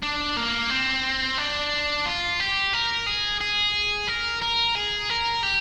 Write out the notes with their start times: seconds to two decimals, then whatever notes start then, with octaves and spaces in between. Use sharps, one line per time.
0.03 D4
0.37 A#3
0.70 C4
1.38 D4
2.06 F4
2.40 G4
2.73 A#4
3.06 G#4
3.41 G#4
4.08 A#4
4.42 A#4
4.76 G#4
5.10 A#4
5.43 G4